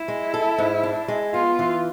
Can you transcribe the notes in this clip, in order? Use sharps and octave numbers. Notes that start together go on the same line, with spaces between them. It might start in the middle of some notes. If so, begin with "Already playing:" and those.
Already playing: E4
G#3
A4
G#2
D4
G#3
B3 F4
E3